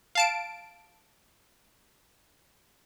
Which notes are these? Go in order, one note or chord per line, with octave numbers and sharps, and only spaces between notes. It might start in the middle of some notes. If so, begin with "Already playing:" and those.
F5 A5 D7